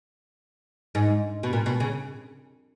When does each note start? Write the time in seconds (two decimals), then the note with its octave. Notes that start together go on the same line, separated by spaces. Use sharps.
0.95 G#2
1.43 B2
1.53 A#2
1.66 B2
1.80 C#3